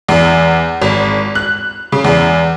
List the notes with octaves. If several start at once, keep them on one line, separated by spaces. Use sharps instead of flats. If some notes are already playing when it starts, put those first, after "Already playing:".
E2
G#1
F#6
C#3
E2